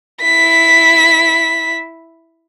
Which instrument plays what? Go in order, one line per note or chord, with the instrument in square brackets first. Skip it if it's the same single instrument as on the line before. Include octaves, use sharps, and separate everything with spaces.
[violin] E4 B6